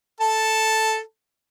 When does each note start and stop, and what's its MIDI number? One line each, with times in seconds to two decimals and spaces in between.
0.20 0.99 69
0.20 0.99 81